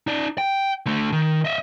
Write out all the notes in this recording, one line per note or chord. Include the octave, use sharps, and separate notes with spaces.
D#4 D5
G5
D3 A3
D#3
D#5 E5